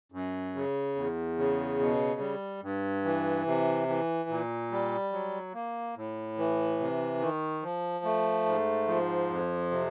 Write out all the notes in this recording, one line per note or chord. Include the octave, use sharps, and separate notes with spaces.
F#2
C#3
E2
C#3
B2
G3
G2
E3
C3
E3
A#2
G3
F#3
A#3
A2
E3
C3
D#3
F3
A3
G#2
F3
F2
C3